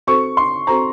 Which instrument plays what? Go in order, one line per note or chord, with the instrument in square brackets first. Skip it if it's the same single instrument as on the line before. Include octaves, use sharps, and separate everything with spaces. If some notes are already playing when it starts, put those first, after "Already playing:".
[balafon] C4 F#4 A4 C5 [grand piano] C#6
[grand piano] C6
[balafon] C4 F#4 A4 C5 [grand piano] A#5